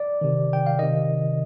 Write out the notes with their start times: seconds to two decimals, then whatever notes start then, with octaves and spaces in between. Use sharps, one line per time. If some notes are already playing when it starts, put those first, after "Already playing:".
Already playing: D5
0.21 C3 D#3
0.53 G5
0.66 F5
0.79 C3 D#3 D#5